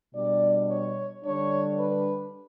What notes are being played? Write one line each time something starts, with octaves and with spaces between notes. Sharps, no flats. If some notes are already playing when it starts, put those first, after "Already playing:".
B2 G3 D4 D5
C#5
D3 G3 D4 C#5
B4